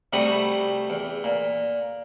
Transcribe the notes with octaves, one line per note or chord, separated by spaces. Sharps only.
C3 G3 A3 F#4 B5 D#6
E2
A#2